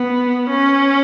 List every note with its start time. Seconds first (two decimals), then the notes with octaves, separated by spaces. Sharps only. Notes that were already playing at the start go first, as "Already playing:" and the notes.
Already playing: B3
0.50 C#4